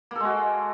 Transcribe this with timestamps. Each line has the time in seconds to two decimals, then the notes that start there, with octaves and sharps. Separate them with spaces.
0.11 A#3
0.16 A4
0.20 G#3
0.25 F#4